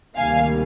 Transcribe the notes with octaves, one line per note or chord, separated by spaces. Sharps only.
D2 C3 D#3 G3 A#3 F5 G#5